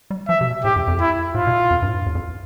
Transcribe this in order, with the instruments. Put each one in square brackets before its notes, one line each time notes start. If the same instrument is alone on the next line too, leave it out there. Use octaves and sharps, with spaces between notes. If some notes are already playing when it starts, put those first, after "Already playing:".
[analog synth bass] G3
[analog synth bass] F3 [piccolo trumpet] E5
[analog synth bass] C3
B2
[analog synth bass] A2 [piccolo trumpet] G4
[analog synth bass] F2
F2
[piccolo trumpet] E4
[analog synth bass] A2 [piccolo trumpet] F4
[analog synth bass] B2
F2
G2
A2
G2
E2
F2